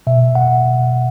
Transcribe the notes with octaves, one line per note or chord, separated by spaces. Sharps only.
B2 E5
F#5